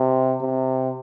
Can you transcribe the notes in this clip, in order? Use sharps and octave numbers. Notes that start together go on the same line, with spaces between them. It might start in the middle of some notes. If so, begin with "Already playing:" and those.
Already playing: C3
C3